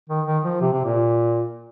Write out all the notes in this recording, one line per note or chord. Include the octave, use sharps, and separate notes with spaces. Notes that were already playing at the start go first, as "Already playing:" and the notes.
D#3
D#3
F3
C3
C3
A#2